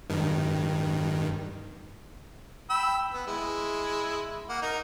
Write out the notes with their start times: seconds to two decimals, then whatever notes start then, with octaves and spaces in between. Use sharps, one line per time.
0.10 G2 D#3
2.70 G5 B5 E6
3.14 B3
3.27 G#3 E4
4.49 A#3 F#5
4.62 D#4 A#4